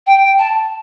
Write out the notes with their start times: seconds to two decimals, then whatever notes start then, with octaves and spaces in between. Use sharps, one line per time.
0.06 G5
0.39 A5